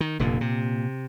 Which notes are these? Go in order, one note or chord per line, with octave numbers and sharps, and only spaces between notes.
D#3
F1 F2 A#2 D3
C3